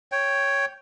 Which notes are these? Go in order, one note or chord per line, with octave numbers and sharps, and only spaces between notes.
C#5 G5